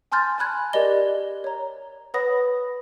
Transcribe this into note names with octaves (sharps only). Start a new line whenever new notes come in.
G#5 A5 C6 F6 G6 A6
G#5 A5 B5 F#6 G#6
G4 A#4 D5 D#5 G7
C#5 A#5
B4 C#5 F#5 B5 D#6 A#6